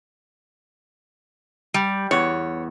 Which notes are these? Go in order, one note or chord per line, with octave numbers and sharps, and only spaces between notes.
G3
E2 C#5 F#5